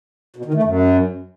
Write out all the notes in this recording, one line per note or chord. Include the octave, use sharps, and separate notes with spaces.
B2
D#3
A3
F#2